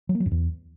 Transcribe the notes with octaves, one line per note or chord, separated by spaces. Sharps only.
F#3
A#3
F#3
F#2
E2